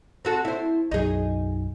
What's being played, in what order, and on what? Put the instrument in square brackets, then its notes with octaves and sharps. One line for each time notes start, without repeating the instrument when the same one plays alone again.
[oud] C4 F#4 A4
E4 C5
[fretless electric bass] B1 F#2 F#3 [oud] D#4 G#4